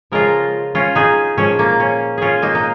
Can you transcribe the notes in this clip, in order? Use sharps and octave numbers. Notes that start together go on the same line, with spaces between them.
C#3 F3 G#3 F4 A#4
C#4 F4
D#4 G#4
A#2 F3 G#3 C#4
A#3
C#4
C#4 F4 G#4
A#3 D#4
D#4